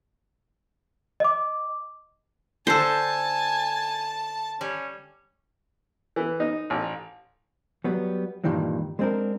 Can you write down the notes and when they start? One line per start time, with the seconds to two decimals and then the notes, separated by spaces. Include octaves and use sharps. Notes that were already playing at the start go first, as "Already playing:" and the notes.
1.20 D#5 D6
2.67 D3 A4 C5 G#5 A5
4.61 G3 C#4
6.16 E3
6.40 D#4
6.70 A1
7.84 F#3 G3 B3
8.44 G2 A#2 D#3 E3 G3 G#3
8.99 G#3 B3 C4 D4 A#4